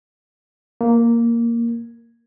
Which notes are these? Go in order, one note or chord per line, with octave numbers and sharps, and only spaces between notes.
A#3